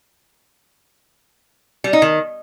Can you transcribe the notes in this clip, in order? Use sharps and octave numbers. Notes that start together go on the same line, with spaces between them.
G3
D#4
D#3